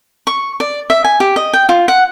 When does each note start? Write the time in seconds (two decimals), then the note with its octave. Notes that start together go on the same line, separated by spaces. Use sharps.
0.27 C#6
0.60 D5
0.90 E5
1.04 G#5
1.20 G4
1.36 D#5
1.53 G5
1.69 F4
1.88 F#5